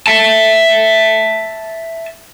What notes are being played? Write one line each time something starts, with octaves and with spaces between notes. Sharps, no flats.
E5 A5